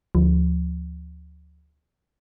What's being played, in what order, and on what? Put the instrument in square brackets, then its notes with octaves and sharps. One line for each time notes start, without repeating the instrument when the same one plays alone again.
[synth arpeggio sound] D2 F3